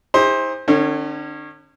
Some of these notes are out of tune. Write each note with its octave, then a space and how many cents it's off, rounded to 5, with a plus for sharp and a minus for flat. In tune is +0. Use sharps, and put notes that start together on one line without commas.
E4 -45 G#4 -45 C5 +15
D3 +40 C#4 -20